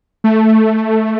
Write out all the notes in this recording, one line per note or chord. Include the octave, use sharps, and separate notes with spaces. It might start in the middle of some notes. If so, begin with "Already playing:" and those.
A3